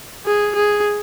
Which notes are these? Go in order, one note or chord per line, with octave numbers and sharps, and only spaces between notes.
G#4
G#4